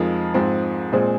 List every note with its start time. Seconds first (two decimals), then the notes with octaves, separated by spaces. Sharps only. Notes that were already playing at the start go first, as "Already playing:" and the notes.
Already playing: F2 F3 G#3 D#4 A#4
0.34 G#2 F3 C4
0.92 A#2 G#3 C4 G#4 C5